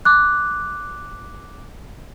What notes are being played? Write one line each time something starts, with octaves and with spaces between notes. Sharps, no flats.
D6 F#6